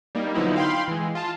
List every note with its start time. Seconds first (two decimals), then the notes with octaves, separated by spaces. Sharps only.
0.15 G3 A#3 D#4
0.34 D3 F3 F#3 B3 D#4 E4
0.56 F5 G5 B5 C6
0.88 E3 G#3
1.15 F4 A5